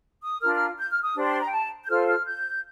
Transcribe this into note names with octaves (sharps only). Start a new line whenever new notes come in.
D#6
D4 F4 A#4 F6
F6
G6
F6
D#6
D4 G4 C5
C6
A#5
G5
A5
G6
F4 A4 C5 F6
F6
G6